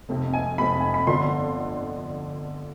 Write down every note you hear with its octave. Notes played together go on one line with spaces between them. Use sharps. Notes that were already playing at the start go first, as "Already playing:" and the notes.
F1 F2 C3
G#5
F1 F2 C3 B5
G#5
B5
G1 F2 D3 F3 C6